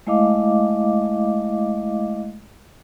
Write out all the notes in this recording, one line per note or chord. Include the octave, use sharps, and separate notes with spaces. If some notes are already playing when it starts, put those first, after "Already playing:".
G#3 A3 E4 D#5 F5 D6